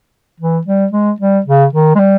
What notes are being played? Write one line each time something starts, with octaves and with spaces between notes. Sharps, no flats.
E3
G3
G#3
G3
C#3
D#3
G#3
G3